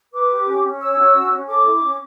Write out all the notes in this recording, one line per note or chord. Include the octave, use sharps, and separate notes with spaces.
B4 D6
G4
C#4
C#4
C#5 E6
F#4
C#4
C#4
A4 D6
E4
C#4